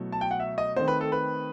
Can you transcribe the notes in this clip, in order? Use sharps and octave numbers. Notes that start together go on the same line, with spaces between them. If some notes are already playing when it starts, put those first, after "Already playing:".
Already playing: B2 F#3 A3 E4
A5
G5
F#5
E5
D#5
D#3 A3 C4 C5
B4
A4
B4